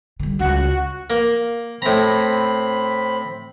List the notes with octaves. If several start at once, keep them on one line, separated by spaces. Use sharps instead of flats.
D3 G3
C#2 F#4
A#3
A2 C4 A#5 B5